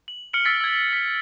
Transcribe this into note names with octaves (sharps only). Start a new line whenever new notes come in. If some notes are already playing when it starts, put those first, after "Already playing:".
F#7
F6 C#7 D7 F#7
E6 A6 B6 D7
E6 G#6
B6